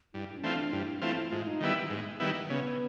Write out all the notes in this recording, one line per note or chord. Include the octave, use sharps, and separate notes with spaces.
G2 E4
C#4
E3 A3 C4 D4 F4
G2 E4
E3 A3 C4 E4 F4
G#2 F4
D#4
D#3 G3 B3 E4
G#2
D#3 G3 B3 E4
C#3 B3